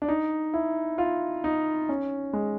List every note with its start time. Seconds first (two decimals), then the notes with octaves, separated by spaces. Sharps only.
0.02 D4
0.08 D#4
0.54 E4
0.98 F4
1.44 D#4
1.89 C#4
2.33 G#3